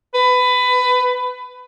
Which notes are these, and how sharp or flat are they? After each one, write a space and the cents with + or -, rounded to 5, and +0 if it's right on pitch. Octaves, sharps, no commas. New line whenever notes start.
B4 +20